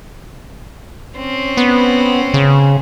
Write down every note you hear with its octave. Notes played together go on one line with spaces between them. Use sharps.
C4 C#4
B3
C#3